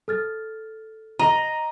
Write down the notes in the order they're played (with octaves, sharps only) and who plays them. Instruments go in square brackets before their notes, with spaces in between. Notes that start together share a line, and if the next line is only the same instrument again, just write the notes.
[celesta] A4 F6 A6
[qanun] D#5 [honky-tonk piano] A#5